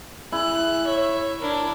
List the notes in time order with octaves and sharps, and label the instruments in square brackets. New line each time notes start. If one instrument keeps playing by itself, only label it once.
[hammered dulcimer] E4 [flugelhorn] G#4 [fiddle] F#6
[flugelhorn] C#5 [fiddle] E5
[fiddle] D4 E4 [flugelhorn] A#4